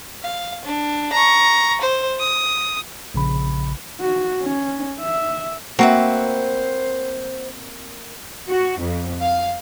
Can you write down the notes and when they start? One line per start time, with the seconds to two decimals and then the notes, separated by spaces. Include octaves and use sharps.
0.23 F5
0.64 D4
1.12 A#5 C#6
1.81 C5
2.20 D#6
3.14 A#1 C#3 B5
4.01 F#4
4.43 C#4
5.01 E5
5.79 A#3 C4 F#4 B4 C5 E5
8.48 F#4
8.79 F2
9.21 F5